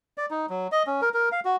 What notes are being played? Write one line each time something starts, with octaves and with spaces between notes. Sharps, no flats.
D5
D#4
F#3
D#5
C#4
A#4
A#4
F5
F#4